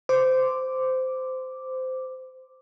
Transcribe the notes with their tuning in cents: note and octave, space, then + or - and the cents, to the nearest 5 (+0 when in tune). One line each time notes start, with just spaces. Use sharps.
C5 -15 D6 +0